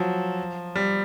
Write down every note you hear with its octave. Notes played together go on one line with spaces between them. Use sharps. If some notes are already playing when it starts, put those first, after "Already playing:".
Already playing: F3 F#3
G3